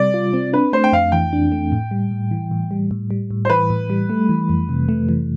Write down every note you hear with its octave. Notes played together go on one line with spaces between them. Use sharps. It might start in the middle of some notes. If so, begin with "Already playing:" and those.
Already playing: C3 G3 C4 D5
F4
C4
D4 B4
A3 C5
G5
F2 F5
E3 G5
D4
A3
A2
G3
A2
E3
A2
G3
A2
G3
A2
C5
E3 B4
A2
G3
A3
E3
F2
C3
A3
E3